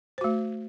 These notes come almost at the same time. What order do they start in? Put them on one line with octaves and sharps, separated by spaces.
C5 F#4 A3